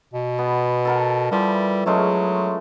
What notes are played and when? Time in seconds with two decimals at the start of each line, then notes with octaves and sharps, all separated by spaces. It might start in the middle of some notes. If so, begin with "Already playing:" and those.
0.14 B2
0.38 B3
0.85 A4 A#4 F#5
1.32 E3 F3 G3
1.86 F#3 G#3 A3 C#4